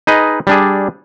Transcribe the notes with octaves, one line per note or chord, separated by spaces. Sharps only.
D#4 G#4 B4 D#5
G3 D4 G#4